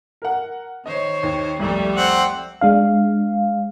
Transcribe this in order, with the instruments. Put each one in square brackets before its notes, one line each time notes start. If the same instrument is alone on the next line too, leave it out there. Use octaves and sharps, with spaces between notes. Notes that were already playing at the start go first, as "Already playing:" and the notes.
[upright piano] A#4 F#5
[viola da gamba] D#3 C5 C#5 [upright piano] D#5
[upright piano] D#2
[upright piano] C2 F2 [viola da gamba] G3 A3 A4
[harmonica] C4 F#5
[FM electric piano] G#3 D4 F5